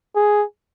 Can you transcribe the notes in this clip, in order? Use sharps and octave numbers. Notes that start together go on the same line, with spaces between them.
G#4